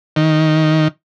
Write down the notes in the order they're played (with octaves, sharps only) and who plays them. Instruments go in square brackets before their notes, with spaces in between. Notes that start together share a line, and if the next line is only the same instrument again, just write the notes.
[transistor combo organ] D#3